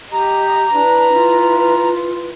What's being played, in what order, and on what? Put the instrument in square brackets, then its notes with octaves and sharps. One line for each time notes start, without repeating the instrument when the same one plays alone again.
[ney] G4 [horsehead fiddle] D#5 [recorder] A#5
[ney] D4 [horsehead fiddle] E4 B4
[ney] F4